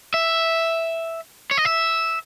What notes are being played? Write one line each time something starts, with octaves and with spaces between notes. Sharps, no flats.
E5
C#5
D#5
E5